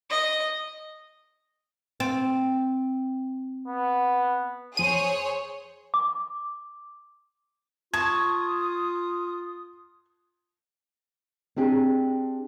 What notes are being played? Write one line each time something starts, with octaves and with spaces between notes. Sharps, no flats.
D#5
C4
B3
F2 G#4 C5 C#5 D#7
D6
F4 A5 C#6 D#6 G#6
C4 D4 G4 G#4